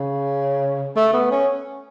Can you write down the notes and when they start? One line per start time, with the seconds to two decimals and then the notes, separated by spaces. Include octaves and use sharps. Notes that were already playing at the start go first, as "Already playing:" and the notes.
Already playing: C#3
0.96 A3
1.13 B3
1.31 C#4